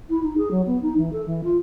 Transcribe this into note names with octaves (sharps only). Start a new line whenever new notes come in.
E4
D#4
G#4
F#3
B3
D#4
E3
A4
E3
F4